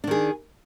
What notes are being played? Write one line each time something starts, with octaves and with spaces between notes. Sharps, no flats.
D#3 D4 G#4